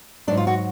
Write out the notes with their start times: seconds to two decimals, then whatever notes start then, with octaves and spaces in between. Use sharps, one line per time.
0.27 F#3 D4
0.31 G#2
0.37 F4
0.47 F#4